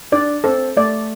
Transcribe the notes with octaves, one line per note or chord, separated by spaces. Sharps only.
D4 D5
C4 A4
A3 D5